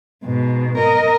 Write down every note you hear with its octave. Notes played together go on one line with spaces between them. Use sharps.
G#2 B2
A#4 D#5